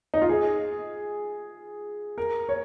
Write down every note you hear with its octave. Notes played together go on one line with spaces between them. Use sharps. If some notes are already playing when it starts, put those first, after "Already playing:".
D#4
F4
G#4
A#4
C#5